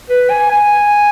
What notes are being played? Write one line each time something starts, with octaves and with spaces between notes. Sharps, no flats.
B4
G#5
G#5